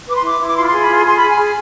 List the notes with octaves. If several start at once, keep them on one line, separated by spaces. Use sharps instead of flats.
B4 D6
C6
E4 D6
E4
D6
F4 C6
B5
G#4 C6
B5
F4 C6
G#4 C6
G#4 B5
G#5
G#4